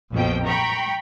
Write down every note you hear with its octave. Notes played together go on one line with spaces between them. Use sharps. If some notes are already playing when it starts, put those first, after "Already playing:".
A#1 F2 B2 G5
G5 A#5 B5 C#6